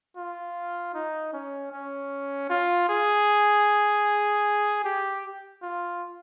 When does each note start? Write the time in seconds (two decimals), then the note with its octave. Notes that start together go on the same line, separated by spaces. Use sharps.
0.17 F4
0.94 D#4
1.33 C#4
1.72 C#4
2.50 F4
2.89 G#4
4.84 G4
5.62 F4